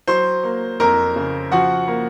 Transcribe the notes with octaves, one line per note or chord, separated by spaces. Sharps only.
F#3 C5 C6
A#3
F2 A#4 A#5
C#3
F3 F#4 F#5
A#3